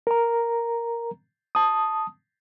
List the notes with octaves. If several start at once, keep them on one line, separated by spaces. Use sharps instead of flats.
A#4 A#5
A5 D#6